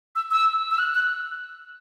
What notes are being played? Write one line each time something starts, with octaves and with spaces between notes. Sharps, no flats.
E6
E6
E6
F#6
F#6